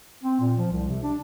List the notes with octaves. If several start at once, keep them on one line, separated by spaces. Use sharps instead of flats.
C4
A#2
F3
C2
C3
D4